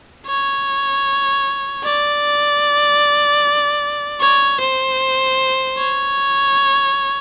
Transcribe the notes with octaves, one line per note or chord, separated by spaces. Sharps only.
C#5
D5
C#5
C5
C#5